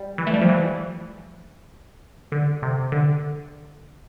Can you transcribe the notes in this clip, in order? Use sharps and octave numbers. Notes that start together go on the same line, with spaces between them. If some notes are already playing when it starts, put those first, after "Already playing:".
Already playing: G3
E3
A3
G3
F3
E3
D3
C3
D3